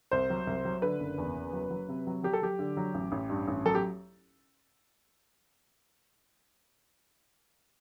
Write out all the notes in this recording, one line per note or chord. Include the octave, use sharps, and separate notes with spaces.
C2 C5
F#3
C2
F#3
D3 B4
F#1
E2
F#1
F#3
F#3
C3
F#3
F#3 G4
A4
F#3 G4
D3
F#3
A1
A1
G2
A1
F#3 A4
G4